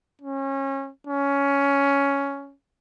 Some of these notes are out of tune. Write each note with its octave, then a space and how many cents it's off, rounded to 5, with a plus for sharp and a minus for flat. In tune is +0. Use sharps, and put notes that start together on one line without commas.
C#4 -25
C#4 +10